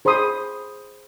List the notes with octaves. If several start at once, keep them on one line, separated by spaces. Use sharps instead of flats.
G#4 C5 B5 C6 D#6